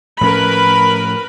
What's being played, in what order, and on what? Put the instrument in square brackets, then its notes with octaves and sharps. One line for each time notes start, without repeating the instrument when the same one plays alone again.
[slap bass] A2 F3 C#4 [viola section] A#4 B4 B5